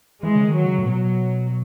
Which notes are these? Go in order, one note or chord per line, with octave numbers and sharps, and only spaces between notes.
E3 G#3
C#3
D#3
F#3
C#3
A2
B2 F#3